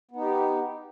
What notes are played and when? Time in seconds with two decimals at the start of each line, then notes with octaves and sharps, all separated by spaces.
0.11 B3
0.16 D#4
0.21 G4